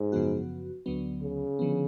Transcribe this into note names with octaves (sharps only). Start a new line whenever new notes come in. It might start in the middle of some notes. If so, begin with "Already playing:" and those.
Already playing: G#2
F#2 C#3 F3 B3 F#4
D2 D3 F#3 B3
C#3
D3 F3 B3